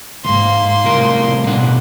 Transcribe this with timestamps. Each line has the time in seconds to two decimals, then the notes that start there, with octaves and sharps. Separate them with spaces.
0.25 D2 G#2 A#3 C6
0.84 C2 A2 A#4
1.47 B2 D4 F#5